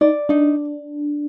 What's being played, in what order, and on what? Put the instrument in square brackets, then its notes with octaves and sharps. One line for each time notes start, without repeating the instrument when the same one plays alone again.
[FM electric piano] D#4 [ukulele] D5
[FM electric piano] D4 [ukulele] D#4